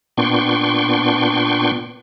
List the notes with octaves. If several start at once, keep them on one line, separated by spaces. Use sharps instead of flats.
A#2 B3 D4 G5 C6 C#6